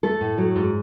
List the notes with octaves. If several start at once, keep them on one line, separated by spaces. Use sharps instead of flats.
A3 A4
A2
F#3
G#2